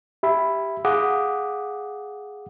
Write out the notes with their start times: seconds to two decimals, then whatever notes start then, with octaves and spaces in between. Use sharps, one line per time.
0.23 G4 E5 B5
0.85 G#4 F5 F#5 D6 D#6